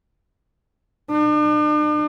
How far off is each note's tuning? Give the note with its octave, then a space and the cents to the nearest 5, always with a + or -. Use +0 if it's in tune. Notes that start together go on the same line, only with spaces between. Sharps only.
D4 +40